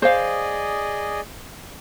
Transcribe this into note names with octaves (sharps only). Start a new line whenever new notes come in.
G#4 C5 D5 D#5 F5